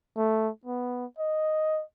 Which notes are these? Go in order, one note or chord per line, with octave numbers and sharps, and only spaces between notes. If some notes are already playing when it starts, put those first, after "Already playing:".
A3
B3
D#5